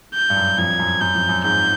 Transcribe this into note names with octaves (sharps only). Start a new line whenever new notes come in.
G6
G2
F#2
F2 G#6
F#2
F#2 G6
F2
F#2
G#2 G6